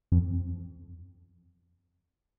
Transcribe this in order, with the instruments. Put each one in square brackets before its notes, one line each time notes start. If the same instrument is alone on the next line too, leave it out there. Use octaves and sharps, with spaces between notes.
[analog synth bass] F2